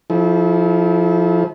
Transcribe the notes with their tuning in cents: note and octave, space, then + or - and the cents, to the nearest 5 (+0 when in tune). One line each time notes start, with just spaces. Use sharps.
F3 +0 E4 -30 A4 -35